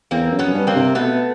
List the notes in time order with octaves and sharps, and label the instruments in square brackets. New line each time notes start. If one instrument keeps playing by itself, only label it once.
[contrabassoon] E2 [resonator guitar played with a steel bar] A#3 C4
[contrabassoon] F#2
[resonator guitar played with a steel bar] B3 C#4
[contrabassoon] F#2
G2
[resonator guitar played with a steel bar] A#3 C4
[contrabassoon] C3
[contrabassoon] B2 [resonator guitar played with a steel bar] A3 B3